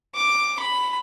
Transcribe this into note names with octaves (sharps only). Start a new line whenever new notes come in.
D6
B5